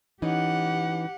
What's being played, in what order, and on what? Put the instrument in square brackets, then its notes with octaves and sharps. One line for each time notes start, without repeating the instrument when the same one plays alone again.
[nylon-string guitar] E3 C#4 D#4 [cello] G4 F#5